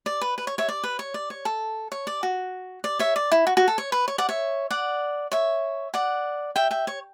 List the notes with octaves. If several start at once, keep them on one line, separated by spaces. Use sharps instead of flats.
D5
B4
B4
C#5
C#5 E5
D5
B4
C#5
D5
C#5
A4
C#5
D5
F#4
D5
C#5 E5
D5
E4
F#4
F#4
A4
C#5
B4
C#5
D5 F#5
C#5 E5
D5 F#5
C#5 E5
D5 F#5
E5 G5
E5 G5
C#5